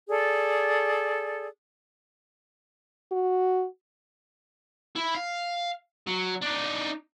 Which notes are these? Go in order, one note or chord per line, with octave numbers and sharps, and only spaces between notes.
G#4 A4 D5
F#4
E4
F5
F#3
D4 D#4